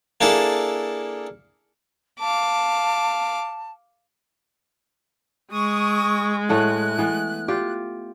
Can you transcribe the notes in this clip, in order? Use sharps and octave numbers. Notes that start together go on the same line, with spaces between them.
A#3 D4 E4 G#4 A4
F5 A5 D6
G#3 C#6 D#6
A2 A3 F#5 F#6
E3 B3
F4 G4